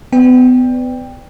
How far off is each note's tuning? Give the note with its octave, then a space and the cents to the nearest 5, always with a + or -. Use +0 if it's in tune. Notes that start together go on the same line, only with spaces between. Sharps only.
B3 +35 D5 +0 G5 +15